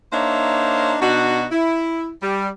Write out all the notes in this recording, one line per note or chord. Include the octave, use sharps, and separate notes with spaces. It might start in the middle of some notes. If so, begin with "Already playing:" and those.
A#3 D4 D#4 C5 C#5 E5
B2 D4 D#4 F#4
E4
G3